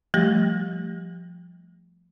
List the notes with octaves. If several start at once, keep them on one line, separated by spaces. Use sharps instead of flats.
F3 G3 A3 G4 A#6